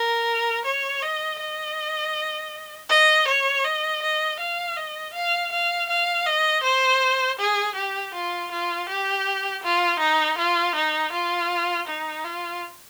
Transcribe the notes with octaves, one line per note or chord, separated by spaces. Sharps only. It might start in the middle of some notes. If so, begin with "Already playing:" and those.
Already playing: A#4
C#5
D#5
D#5
D#5
C#5
D#5
D#5
F5
D#5
F5
F5
F5
D#5
C5
G#4
G4
F4
F4
G4
F4
D#4
F4
D#4
F4
D#4
F4